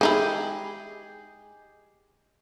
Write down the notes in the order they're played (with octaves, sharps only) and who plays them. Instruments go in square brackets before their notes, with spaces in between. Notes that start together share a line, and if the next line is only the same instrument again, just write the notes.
[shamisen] G#3 D#4 E4 [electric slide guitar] G4 G#4 D#5